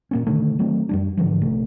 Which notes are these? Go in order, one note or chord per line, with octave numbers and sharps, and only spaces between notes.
A#2 A#3 C#4
B2 D3 D#3 A3
D#3 F#3 A3 C4
F#2 G3 D4
G#2 D3 E3 F3
A#1 C3 A3